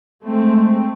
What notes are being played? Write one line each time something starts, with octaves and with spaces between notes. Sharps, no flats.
G#3 A3 C4